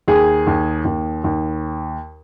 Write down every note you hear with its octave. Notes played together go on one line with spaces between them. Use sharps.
D#2 G#4
D#2
D#2
D#2